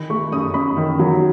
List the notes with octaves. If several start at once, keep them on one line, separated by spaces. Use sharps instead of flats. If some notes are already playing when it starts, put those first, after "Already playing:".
Already playing: D#3 B5
A3 C#6
F#2 D#6
F#2 B5
D#3
F#3